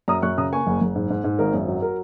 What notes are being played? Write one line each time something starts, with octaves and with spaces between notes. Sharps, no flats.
F#2 A#5 D#6
F#2 C#6 F#6
C#3 A#5 D#6
A#3 G#5 C#6
F#1
F#1
G#2
G#2
G#2
G#1 A#4
F#2
F#3
A#4